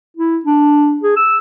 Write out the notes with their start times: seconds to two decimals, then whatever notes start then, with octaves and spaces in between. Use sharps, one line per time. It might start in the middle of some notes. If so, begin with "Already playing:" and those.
0.17 E4
0.46 D4
1.04 G#4
1.16 E6